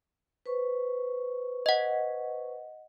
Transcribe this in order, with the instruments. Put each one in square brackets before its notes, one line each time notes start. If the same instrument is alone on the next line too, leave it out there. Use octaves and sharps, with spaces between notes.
[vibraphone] B4 C5 C#6
[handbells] D#5 F#5